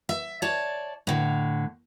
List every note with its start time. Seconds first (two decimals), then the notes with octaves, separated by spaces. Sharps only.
0.09 E5
0.42 C#5 D5 A5
1.07 A2 D3